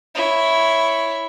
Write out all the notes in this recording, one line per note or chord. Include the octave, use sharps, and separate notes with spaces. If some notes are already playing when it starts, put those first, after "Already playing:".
E4 C#5